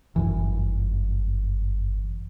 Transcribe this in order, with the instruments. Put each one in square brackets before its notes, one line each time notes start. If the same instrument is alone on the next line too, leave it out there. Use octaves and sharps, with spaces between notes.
[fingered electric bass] G1 F#2 E3